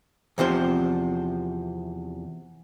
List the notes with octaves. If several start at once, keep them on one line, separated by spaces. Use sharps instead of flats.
E2 C3 F3 C5